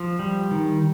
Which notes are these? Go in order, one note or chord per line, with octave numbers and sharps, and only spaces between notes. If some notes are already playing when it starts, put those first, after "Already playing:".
Already playing: F3
G3
D#3